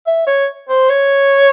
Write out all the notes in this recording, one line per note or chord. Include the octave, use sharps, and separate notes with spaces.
E5
C#5
C5
C#5